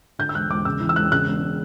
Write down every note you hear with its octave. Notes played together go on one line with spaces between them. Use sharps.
D3 G6
E6
E1 F#6
E1 D6
C#3 E6
E3
E6
E1 F#6
C#3 F#6
E1